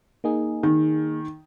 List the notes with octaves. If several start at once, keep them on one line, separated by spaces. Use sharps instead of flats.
A#3 D#4 G#4
D#3